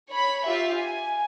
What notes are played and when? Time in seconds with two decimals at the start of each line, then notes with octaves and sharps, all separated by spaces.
0.10 C#5 B5
0.47 F4 G4 E5
0.79 G#5